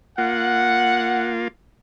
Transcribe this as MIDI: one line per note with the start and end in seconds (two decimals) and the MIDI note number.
0.18 1.48 58
0.18 1.48 65
0.18 1.32 78